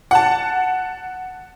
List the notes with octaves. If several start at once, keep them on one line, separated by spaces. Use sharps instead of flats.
F#5 A5